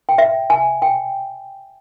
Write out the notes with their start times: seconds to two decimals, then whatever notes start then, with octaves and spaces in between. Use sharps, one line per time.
0.09 G5
0.18 E5
0.50 G#5
0.82 G5